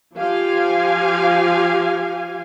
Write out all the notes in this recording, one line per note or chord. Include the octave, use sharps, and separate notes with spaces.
F3 G4 F5 G#5